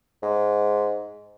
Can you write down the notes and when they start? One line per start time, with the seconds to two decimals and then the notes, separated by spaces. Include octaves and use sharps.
0.23 G#2